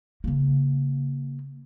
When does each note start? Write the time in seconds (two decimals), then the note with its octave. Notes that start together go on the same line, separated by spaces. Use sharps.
0.24 C#3 A#3